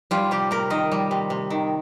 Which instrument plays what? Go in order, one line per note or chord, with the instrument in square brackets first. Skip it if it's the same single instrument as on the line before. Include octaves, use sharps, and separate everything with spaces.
[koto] G3 F4
C3 G4
C3 A#4
D#3 D#5
G3
C3
C3
D#3